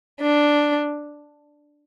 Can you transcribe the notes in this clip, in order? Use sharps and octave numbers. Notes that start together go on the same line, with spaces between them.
D4